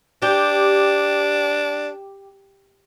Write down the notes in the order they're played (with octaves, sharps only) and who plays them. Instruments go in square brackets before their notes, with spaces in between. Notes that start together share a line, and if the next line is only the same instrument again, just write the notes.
[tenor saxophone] D4 [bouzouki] G4